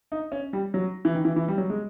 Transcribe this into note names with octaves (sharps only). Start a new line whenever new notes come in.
D#4
C#4
G3
F#3
E3
D#3
E3
E3
G3
F#3
G#3